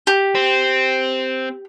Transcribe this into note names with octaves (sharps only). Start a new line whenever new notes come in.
G4
C4